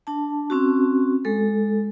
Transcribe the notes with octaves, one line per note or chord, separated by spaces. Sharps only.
D4 A5
C4 C#4 F#4
G#3 A4